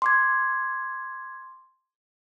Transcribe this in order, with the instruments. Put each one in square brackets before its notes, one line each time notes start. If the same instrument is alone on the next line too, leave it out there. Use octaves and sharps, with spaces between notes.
[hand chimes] C6 D6 G#6